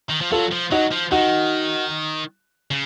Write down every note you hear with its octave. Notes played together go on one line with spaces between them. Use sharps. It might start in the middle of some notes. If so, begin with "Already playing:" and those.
D#3
F3
F#3 F4 A4
F3
F#3 D#4 F#4
F3
D#3 D#4 F#4
C#3